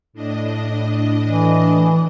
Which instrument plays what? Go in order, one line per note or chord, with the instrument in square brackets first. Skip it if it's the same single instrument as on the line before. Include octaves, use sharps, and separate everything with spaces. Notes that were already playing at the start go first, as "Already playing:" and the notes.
[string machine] A2 D4 D#5
[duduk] E3